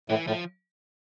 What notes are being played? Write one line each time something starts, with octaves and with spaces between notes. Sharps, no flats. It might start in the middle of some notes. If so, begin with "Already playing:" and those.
A2 E3
A2 F3